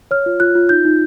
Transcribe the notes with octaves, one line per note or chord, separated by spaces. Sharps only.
C#5 F6
F4
F4 F#6
F4
D#4 G6
D#4